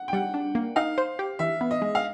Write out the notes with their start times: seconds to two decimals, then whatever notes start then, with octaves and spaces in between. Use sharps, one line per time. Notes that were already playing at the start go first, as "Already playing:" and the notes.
Already playing: F#5
0.08 G5
0.13 G3 F#5
0.34 D4
0.55 A#3
0.76 D#4 F5
0.98 C5
1.19 G4
1.39 E3 E5
1.61 B3
1.71 D#5
1.82 G#3
1.95 F5